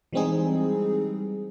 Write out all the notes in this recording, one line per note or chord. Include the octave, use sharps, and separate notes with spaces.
E3 G3 G#3 C4 D#4 G#4